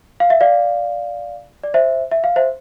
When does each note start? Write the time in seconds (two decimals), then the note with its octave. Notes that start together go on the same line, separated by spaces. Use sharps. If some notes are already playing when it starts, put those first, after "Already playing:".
0.20 F5
0.30 E5
0.41 D5 F5
1.64 D5
1.74 C5 E5
2.11 E5
2.24 F5
2.36 C5 E5